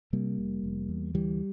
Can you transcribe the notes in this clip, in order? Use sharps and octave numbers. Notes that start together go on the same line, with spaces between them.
C3 G3 A#3
F1
F1
E2
D2 E3 G3